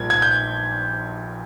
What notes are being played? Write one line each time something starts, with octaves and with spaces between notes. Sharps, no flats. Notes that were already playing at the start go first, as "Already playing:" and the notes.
Already playing: A#1 A#2 G3 G#6
G#6
G6